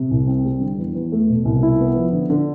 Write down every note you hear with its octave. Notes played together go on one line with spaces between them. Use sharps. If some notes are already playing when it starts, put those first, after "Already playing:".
Already playing: C3
C2
C4
G3
D3
E2
E2
A3
B2
C2
E4
B3
F3
D3
D3